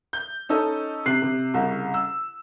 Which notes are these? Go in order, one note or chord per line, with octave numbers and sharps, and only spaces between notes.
G6
C#4 D#4 A4 D#5
C3 F#6 C7
C3
C2 C#3
E6